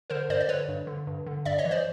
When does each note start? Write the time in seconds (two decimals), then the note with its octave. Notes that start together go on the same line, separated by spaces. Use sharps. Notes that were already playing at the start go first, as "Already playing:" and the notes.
0.10 D3 A#4 C5
0.29 G2 C5 D5
0.41 D5
0.48 D3 B4 C#5
0.69 G2
0.87 D3
1.07 G2
1.27 D3
1.45 G2 D5 E5
1.58 C#5 D#5
1.65 E3
1.71 C5 D5